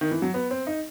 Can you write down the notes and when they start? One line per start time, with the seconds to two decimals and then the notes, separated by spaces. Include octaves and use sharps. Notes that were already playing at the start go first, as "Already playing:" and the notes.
0.01 D#3
0.11 E3
0.22 F#3
0.34 B3
0.51 C4
0.67 D#4